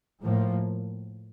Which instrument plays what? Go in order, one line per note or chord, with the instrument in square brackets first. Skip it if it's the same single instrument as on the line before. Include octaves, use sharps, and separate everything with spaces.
[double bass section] A2 F3 A#3